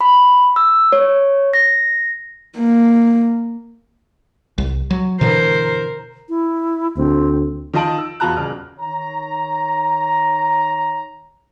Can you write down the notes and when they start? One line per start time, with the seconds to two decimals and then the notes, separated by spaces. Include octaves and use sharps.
0.01 B5
0.56 E6
0.92 C#5
1.53 A#6
2.58 A#3
4.58 C2
4.91 F#3
5.21 B2 D3 E3 A#4 C5
6.29 E4
6.97 D2 C4
7.74 D#3 F4 D#5 A5 D7 F#7
7.98 E6
8.20 E2 B2 F4 A5 A#5 F#6
8.37 D#1 C#3 F6
8.80 D#3 C#5 A#5